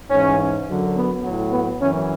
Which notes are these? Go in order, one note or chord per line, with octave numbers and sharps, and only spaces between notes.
G#2 E3 C#4
F#2 D3 F#3
B3
A2 F#3
B3
F#2 E3 C#4